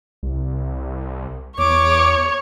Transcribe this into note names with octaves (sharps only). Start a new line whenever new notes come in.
C2
E2 C#5 D6